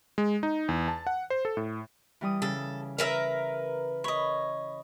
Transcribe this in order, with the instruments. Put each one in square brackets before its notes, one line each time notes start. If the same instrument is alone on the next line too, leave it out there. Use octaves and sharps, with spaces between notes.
[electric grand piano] G#3
D#4
E2
A5
F#5
C5
A4
A2
[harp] E3 G3 D#6
[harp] C#3 [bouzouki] A4
[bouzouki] A#4 B4 E5
[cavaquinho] C#5 D#5 [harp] B5